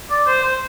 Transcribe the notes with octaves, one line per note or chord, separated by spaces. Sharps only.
D5
C5
C5